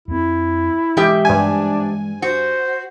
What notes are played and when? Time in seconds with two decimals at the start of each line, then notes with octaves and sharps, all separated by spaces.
0.08 F2 C4 E4
0.97 G#2 E3 G#3 G4 E5
1.25 G2 D4 G#5
2.22 F#4 C5